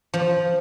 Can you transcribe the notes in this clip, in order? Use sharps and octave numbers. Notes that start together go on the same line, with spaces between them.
F3